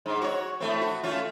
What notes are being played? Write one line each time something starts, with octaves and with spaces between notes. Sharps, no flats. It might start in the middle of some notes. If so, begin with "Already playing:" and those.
G#2
F#4 C#5
A2 A3 C4
F#4
A3 C#4 F4